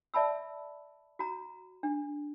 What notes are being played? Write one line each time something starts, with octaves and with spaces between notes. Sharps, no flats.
D5 E5 A5 B5 E6
F#4 A#5
D4